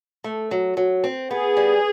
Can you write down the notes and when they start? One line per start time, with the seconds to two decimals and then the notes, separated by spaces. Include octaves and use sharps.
0.24 A3
0.51 F#3
0.77 F#3
1.04 C4
1.31 B3 G#4
1.57 G3